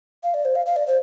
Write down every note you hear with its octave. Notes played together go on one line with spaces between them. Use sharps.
F5
D5
C5
F5
F5
D5
C5